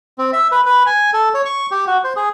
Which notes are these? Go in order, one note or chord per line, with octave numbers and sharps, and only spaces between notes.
C4
E5
B4
B4
G#5
A4
C#5
C#6
G4
F#4
C5
G#4